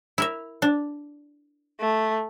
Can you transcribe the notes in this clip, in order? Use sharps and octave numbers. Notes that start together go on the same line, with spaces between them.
E4 A#4 E5
D4
A3